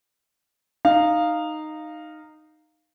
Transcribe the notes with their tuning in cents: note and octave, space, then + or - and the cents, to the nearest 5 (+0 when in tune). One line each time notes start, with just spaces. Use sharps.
D#4 -10 F5 +0